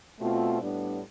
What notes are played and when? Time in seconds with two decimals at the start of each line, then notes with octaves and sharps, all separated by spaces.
0.20 B2 A3 C4 F4
0.61 A2 G3 B3 D4